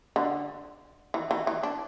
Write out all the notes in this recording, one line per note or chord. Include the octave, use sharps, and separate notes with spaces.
D3
E3
E3
E3
D4